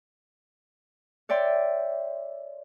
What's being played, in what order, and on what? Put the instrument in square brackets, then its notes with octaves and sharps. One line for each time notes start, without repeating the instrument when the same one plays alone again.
[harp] C#5 D5 E5 G5 C6